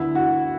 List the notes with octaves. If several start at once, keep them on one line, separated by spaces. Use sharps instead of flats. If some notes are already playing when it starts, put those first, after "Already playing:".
Already playing: D2 D3 B3 E4
F#4